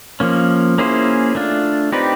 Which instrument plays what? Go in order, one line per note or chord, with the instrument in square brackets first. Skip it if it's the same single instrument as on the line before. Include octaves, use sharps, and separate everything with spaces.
[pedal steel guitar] F3 A#3 C#4
A#3 C#4 E4 G#4 C5
A3 D4 F4
C4 D#4 G4 B4 D5